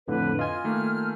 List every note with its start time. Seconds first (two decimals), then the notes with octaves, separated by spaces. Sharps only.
0.08 F2 A2 D3 B4
0.39 F4 D#5 G#5 F6
0.64 D#3 A3 A#3